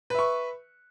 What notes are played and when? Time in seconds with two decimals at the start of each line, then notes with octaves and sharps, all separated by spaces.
0.10 B4
0.14 E5
0.19 C#6